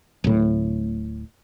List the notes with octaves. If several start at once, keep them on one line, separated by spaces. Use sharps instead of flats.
D1 A2